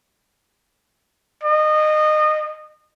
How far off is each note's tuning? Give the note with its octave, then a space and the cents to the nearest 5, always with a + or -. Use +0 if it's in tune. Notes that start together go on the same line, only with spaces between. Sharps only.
D#5 -25